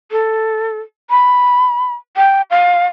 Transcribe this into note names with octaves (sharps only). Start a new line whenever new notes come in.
A4
B5
G5
F5